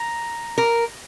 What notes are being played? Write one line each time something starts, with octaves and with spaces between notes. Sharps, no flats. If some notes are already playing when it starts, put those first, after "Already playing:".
Already playing: A#5
A#4